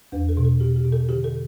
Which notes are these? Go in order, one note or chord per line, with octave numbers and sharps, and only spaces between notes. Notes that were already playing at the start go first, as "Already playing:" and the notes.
E2 B4
A4
B2
A4
B2 G4
G4
B2
A4
D3 G4
A4